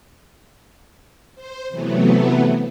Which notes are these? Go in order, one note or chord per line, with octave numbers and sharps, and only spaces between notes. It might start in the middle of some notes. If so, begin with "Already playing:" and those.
C5
C3 E3 F#3 A3 B3